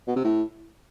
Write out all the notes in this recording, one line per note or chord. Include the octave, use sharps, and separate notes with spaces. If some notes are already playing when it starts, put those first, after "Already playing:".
B2
C3
A2